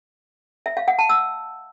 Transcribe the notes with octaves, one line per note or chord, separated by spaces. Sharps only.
E5
F5
F#5
A5
E6